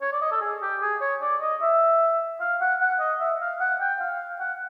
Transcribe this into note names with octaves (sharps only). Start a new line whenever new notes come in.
C#5
D5
D#5
A4
G#4
G4
G#4
C#5
D5
D#5
E5
F5
F#5
F#5
D#5
E5
F5
F#5
G5
F5
F#5